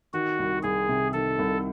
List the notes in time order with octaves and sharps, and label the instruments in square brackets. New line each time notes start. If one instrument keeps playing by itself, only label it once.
[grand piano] D#3 [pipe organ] F#4
[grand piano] C2
[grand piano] C2 [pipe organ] G#4
[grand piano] C3
[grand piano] D#3 [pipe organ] A4
[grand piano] C2